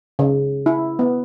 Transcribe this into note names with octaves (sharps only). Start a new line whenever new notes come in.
C#3
E4
B3